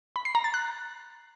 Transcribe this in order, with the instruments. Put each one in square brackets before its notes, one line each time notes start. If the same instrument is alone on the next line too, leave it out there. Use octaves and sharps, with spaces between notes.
[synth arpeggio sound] B5
C7
A#5
A6
F#6